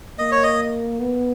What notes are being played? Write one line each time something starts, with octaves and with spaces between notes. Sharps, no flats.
A#3 D#5
C#5
D#5
B3